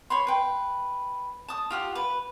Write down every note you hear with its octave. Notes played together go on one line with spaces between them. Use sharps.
C#5 B5 C6
B4 G5
A5 D#6
F4 G4 F#5
B4